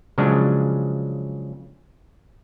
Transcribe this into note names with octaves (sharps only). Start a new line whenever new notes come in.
C#3 F3 F#3 G#3 D4